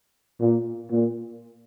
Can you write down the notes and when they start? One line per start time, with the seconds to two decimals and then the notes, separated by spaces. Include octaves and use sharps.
0.40 A#2
0.89 A#2